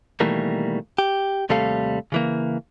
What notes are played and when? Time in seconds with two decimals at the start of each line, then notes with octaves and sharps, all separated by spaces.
0.20 B2 D#3 E3 G3 A3 A#3
0.98 G4
1.49 D#2 C3 G3 A3 A4 F5
2.12 C#3 E3 A#3